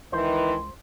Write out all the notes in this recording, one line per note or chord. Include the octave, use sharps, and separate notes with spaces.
C#2 D#3 E3 C5